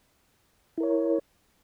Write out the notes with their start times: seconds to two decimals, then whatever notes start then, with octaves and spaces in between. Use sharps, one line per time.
0.78 E4
0.80 A#4
0.83 C#5